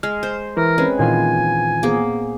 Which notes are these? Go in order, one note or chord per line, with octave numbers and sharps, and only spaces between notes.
G#3 F6
C5
E3 A#4
G#3 C4 C#4 B4
A#2 D#3 E3 F4 G#5
A#3 B3 G#4 C5